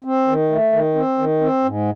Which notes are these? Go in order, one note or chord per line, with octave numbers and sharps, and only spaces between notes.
C4
D#3
A3
D#3
C4
D#3
C4
G#2